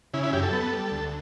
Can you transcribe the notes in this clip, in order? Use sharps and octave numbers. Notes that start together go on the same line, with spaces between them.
C#3 E4
E4
F#2 G4
A4
B3
G3
D2